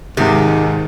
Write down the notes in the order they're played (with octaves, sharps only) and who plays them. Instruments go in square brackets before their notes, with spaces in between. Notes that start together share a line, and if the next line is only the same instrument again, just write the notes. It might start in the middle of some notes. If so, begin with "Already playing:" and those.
[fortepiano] C#2 C3 [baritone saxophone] G#2 [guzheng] D#3